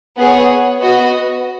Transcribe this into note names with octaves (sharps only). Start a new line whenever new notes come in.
B3 G#4 C#5
B3 F#4 D#5